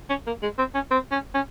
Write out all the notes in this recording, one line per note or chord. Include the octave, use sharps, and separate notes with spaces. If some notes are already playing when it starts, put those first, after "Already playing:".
C#4
A#3
G#3
C4
C#4
C4
C#4
C#4